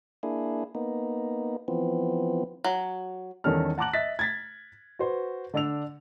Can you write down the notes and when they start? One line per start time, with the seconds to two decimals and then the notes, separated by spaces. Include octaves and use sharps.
0.23 A#3 D4 E4 G#4
0.75 A#3 B3 D#4
1.68 E3 F3 B3 C4
2.64 F#3
3.44 E2 D#3 G3 C#4 A4 F6
3.78 F#5 A5 A#5 D6 F#6 F#7
3.93 D#5 E5 F#6 A6 B6
4.19 G#6 A6 B6
4.99 F#4 B4 C5
5.54 D3 D4 D5 E6 F7